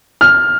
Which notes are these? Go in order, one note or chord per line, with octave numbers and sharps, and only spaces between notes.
F6